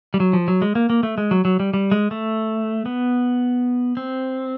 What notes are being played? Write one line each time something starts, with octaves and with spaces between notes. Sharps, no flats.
G3
F#3
F3
F#3
G#3
A#3
A#3
A3
G#3
F#3
F#3
G3
G3
G#3
A3
B3
C4